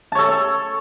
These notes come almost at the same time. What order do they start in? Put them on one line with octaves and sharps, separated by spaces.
A5 C#5 A4